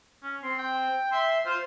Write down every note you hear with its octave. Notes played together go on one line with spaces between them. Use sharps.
C#4
C4 C6
G5
E5 C6
F4 C5